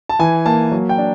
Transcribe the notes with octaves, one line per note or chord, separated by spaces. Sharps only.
A5
E3 G#5
A#3 A5
F#3
G5
D4